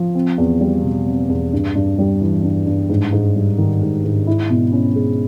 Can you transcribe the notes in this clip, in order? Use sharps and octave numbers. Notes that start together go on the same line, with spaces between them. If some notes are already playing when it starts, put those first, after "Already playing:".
Already playing: F3
C4
E2
G3
B2
C4
E2
G2
G2
G3
E3
G2
G2
G#2
G#2
G3
D#3
G#2
G#2
E4
B2
C#4
G#3